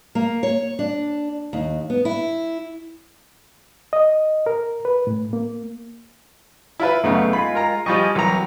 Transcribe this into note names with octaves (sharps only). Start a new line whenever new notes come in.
A#3
C#5
D4
D#2
B3
E4
D#5
A#4
B4
A2
A#3
E4 F4 B4
F#2 C#3 A3 B3 D#4
G#3 F4 B5
A#4 A#5
F3 G3 G#4 D#5 C#6
C2 E3 F#3 A#5